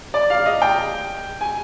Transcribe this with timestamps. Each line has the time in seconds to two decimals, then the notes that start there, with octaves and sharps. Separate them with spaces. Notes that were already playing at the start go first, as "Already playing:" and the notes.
0.14 D5
0.30 F5
0.46 D#5
0.62 G5
1.41 G#5